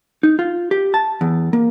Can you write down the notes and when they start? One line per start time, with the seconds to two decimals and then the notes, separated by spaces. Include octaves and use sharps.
0.23 D#4
0.39 F4
0.71 G4
0.94 A5
1.21 E2
1.53 A#3